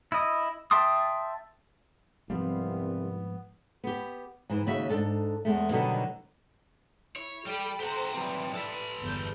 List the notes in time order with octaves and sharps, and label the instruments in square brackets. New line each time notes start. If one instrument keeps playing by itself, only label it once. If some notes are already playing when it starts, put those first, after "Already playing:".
[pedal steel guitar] E4 D#5
E5 G5 A5 C6 D#6
[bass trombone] C2 [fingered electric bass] G#2 F3 G3 [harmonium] B3 [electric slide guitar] C4 F5
[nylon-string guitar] B3 G4
G#2 E3
D#2 C#3 F#4 E5
G#2 D4 A4 A5
E2 G#3 A3
B2 D3 D#3 F#3 G3 B3
[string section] E4 [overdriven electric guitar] C#5
[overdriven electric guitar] G3 G4 [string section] A4 G5 B5
[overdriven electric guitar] G4 F#5 [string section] A4 C5 A#5
[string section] E3 G3 [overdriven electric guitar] F#3 C4
[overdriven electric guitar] A4 B4
[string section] G1 E2 G6